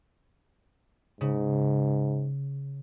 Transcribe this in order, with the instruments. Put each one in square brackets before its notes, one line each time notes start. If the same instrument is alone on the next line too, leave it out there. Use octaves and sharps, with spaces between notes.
[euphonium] G#2 [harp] C#3